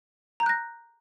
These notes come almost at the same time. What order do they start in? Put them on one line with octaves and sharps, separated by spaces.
A#5 G6 F#6 A#6